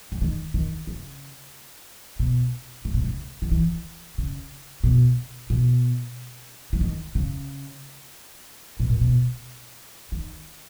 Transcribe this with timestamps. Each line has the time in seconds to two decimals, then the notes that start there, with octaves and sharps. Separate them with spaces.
0.12 C#3
0.21 D#3
0.54 D#3
0.87 C#3
2.19 B2
2.85 C#3
2.94 B2
3.04 C#3
3.42 D#3
3.51 E3
4.18 C#3
4.84 B2
5.50 B2
6.73 E3
6.81 D#3
7.15 C#3
8.80 B2
8.89 A#2
9.01 B2
10.12 D#3